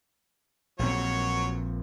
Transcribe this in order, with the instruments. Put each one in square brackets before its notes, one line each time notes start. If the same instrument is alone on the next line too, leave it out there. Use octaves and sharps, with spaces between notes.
[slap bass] A#1 C4 [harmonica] F#3 C#5